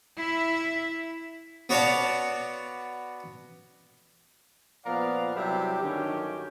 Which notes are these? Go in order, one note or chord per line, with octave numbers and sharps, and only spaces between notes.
E4 E5
B3 F#4 C#5 D5 F5 A5
A#2 F3 B3 A#4 D5 F5
C3 F#3 G3 E4 G4
G2 D3 D#3 F#3 C#4 G4